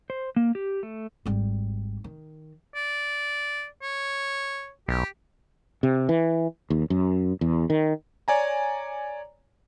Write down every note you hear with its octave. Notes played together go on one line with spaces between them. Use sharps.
C5
A#3
G4
A3
G#1 G3
D#3
D5
C#5
B1 G4
C3
E3
D#2
F#2
E2
D#3
C#5 D5 G#5 A#5